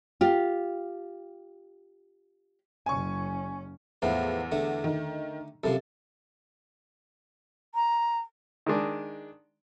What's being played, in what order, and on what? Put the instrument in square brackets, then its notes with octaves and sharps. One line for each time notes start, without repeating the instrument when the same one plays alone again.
[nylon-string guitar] F4 G4
[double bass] F#1 C#4 [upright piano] G#5 C#6
[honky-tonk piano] E2 B3 [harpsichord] A2 E3 F3
[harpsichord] D3 A3
[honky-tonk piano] D#3
[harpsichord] F#2 C3 F3 [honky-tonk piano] A4
[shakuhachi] A#5
[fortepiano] D#3 G#3 D4